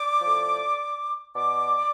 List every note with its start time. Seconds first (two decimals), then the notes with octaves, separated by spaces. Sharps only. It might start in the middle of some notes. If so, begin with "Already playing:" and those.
Already playing: D5 D6
0.21 A2 F3
1.35 B2 D5 D6